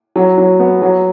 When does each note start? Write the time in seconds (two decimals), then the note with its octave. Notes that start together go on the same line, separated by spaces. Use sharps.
0.16 F#3
0.38 F#3
0.59 B3
0.82 F#3